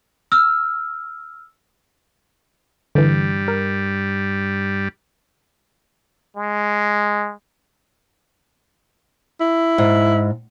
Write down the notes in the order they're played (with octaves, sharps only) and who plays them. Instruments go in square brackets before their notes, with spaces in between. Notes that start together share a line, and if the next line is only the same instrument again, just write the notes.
[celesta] E6 F6
[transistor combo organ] G2 G3 [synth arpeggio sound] D3 E3
[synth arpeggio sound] A#4
[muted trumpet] G#3
[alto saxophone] E4
[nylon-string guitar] G#2